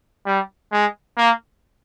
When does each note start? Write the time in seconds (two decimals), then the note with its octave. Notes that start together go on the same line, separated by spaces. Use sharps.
0.26 G3
0.72 G#3
1.17 A#3